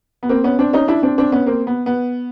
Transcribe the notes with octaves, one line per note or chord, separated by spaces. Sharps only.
B3
A#3 C4
B3 C#4
C4 D4
C#4 D#4
D4 E4
C4 D4
C4 D4
B3 C#4
A#3 C4
B3
B3